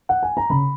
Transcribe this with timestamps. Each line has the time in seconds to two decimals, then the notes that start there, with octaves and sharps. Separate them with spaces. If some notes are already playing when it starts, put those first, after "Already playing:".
0.09 F#5
0.23 G#5
0.37 A#5
0.50 C#3 B5